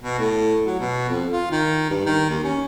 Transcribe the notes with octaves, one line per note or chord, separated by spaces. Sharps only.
B2
A2
F#3
B2
F2
F4
D#3
G2
D#3
D#2
C#4